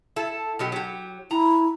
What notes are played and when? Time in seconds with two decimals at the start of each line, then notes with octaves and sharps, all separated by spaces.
0.16 E4 A4
0.59 B2 F#3 G4
0.72 F#3 G4
1.31 E4 A#5